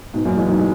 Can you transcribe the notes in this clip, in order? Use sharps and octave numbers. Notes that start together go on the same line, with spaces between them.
G#2 B2
F#2 A#2
E3 G#3
D#3 F#3
G#3